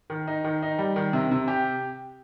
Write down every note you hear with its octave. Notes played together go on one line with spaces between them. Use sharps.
D#3
D#4
D#3
D#4
G3
D#3
C3
C3
G4